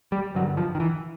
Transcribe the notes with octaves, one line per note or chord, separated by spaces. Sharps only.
G3
G2 D3 F#3
F3
D#3
E3